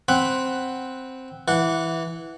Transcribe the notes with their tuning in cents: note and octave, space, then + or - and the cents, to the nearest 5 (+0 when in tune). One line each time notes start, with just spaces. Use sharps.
C4 +0 F#5 +5 B5 +0
E3 +0 F#5 -10